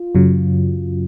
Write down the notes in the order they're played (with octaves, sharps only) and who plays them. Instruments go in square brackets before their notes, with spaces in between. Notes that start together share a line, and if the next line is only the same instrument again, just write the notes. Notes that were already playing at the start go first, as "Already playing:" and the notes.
Already playing: [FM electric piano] F4
F#2 C#3 F#3